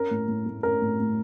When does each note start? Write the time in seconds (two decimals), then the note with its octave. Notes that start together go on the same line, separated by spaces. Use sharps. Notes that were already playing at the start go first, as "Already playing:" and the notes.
Already playing: C#4 A#4
0.11 A2
0.28 A2
0.46 A3
0.63 C#4 A#4
0.82 A2
1.00 A2